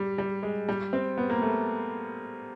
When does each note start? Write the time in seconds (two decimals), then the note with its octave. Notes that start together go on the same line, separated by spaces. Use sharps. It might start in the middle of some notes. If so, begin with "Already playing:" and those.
Already playing: G3
0.18 G3
0.43 G#3
0.69 G3
0.93 C4
1.18 B3
1.30 A#3
1.42 A3